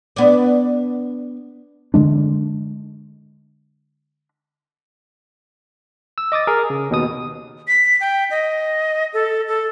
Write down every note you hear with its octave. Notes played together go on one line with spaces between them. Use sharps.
B3 D4
D3 F3 G#3 D4
E6
D#5 D6 D#6 A6
G#4 A#4
C#3
D#2 B2 D#6
B6
G5
D#5
A4
A4